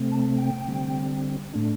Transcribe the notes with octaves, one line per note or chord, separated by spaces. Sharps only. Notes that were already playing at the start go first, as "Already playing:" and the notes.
Already playing: C3 A3 C4
A5
G5
D3 G3 C4
A2 A3 D4